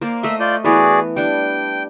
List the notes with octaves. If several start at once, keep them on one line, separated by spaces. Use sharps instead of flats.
A#3 C5 D5
A3 D#5 E5 C6
F4 D5 G6
E3 B3 F#4 G#4 B4 D5
G3 D4 G5